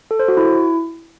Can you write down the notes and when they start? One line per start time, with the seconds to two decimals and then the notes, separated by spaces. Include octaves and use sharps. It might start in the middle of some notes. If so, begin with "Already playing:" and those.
0.11 A4
0.20 C5
0.28 F#4
0.37 E4